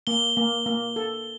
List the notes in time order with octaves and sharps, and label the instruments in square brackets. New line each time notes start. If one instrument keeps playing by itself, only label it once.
[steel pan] A#3 [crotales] G7
[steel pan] A#3
A#3
A4